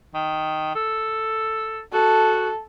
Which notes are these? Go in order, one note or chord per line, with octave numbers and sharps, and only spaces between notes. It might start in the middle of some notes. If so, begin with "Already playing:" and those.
D#3
A4
F#4 A4